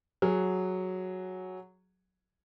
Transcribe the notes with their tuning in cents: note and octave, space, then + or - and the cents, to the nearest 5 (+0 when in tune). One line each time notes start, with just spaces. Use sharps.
F#3 +0 G#4 +0 F#5 +0